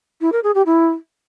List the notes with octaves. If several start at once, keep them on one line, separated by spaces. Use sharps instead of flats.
E4
A#4
G#4
G4
E4